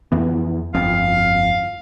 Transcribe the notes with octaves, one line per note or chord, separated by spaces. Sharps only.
F2 E3 B3
G1 F2 F5